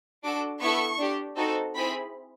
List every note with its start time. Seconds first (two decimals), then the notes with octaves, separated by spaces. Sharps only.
0.23 D4 F#4 A4 D6
0.61 B3 E4 A4 C#6
0.99 D4 G4
1.36 C4 D#4 F#4 A4
1.74 C4 E4 G#4 B5